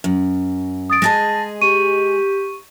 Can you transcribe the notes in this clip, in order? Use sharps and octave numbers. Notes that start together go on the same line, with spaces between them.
F#2
D#6 A6 D7
G#3 G#4 D#5 A5 A6 A#6
G4 C#6 D#7